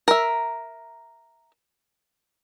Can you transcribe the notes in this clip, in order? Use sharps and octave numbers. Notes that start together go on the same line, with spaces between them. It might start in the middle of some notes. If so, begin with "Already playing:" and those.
A#4 E5